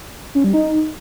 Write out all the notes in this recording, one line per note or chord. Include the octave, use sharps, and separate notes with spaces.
C#4
G3
D#4